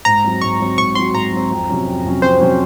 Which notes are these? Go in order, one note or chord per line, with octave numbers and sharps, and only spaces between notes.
G#2 A#5
F#3 C4
G#2 C#6
F#3 C4
G#2 C#6
F#3 C4 C6
G#2 A#5
F#3 C4
F2
C3 F#3 C#4
F2
C3 F#3 C#4
F2 C5
C3 F#3 C#4